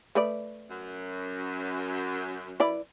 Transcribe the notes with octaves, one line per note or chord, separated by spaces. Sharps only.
A3 B4 D5
F#2
E4 B4 D5